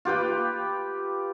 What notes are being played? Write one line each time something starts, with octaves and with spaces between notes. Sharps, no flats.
F4 G4 B4 G5